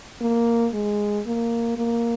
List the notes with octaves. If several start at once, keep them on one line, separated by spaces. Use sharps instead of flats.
A#3
G#3
A#3
A#3